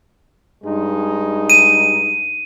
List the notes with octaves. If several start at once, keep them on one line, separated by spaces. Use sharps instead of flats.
G2 G#3 D#4
D#7